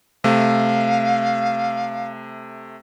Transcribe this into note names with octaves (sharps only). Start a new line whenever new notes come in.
C3 A3 F5